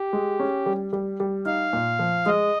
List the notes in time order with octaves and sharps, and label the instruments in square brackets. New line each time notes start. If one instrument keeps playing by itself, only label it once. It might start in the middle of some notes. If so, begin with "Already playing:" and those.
Already playing: [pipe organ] G4
[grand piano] G#3
C#4
G3
G3
G3
[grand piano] D#4 [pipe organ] F5
[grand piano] A#2
F3
[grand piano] G#3 [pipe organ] D#5